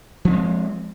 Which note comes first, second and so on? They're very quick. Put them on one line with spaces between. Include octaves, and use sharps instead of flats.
F3 D4 C4 G#3